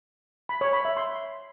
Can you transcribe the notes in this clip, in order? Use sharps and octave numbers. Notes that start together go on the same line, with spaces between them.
B5
C#5
B5
E5
C6